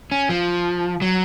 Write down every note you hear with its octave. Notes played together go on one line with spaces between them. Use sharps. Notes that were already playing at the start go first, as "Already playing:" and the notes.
C#4
F3
F#3